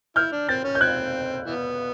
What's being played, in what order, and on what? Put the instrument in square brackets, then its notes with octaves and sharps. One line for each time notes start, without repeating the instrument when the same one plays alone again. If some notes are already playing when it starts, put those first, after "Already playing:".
[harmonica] E4 [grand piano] F6 G6
[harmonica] D4
[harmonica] C4 [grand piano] G6 A6
[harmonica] C#4
[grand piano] G6
[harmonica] C4 [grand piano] F#6 G#6
[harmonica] E3 B3